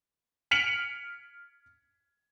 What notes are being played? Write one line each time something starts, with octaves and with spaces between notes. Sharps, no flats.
F6 B6 C#7 D7 F7 F#7